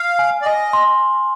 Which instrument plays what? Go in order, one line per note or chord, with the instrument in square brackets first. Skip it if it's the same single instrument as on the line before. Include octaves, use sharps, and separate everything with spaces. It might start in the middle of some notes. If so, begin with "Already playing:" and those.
Already playing: [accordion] F5 [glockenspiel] F6
[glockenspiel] G#5
[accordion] D5
[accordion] D#5 [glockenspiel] G#5
[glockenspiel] C6